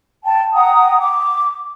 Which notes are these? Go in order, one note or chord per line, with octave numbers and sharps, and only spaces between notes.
G5 A5
F#5 G5 A#5 D#6
D6